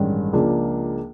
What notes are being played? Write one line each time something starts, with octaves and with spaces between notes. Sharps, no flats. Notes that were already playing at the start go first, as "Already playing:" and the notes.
Already playing: A1 G2 D#3 G#3 C#4
C#2 C#3 F3 A#3 D4